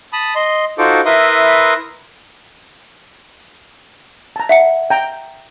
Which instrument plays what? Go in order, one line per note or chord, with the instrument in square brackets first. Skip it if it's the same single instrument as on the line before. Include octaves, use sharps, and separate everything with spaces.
[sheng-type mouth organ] A5 B5 D#6
D#5 C6
D#4 F4 F#4 A4 C5 D6
E4 A#4 B4 E5 C6 D#6
[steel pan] A5 A#5
[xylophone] E5 F#5 C#7
[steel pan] G5 A#5